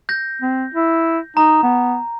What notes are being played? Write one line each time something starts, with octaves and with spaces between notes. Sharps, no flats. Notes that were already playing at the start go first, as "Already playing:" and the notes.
G6 A#6
C4
E4
D#4 A#5
B3